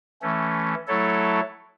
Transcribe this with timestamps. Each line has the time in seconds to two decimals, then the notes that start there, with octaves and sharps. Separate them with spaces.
0.21 E3 A3 C#4
0.87 F#3 A3 E4 A4 C#5